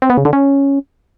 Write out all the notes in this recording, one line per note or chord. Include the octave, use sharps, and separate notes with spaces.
C4
B3
C#3
D3
C#4